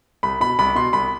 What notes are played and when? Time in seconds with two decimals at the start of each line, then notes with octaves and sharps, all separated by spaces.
0.23 C2 B5
0.41 B2 B5
0.59 C2 B5
0.76 B2 C6
0.93 C2 B5